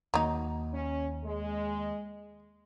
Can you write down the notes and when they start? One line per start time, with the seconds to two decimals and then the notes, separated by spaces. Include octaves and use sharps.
0.14 D#2 D#3 F#3 A#3 D#4
0.73 C#4
1.25 G#3